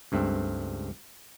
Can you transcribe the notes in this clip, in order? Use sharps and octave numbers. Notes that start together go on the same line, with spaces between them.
C#2 G2 A3 C4